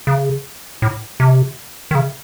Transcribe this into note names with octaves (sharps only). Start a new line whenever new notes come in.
C#3
A2
C3
D#3
C#3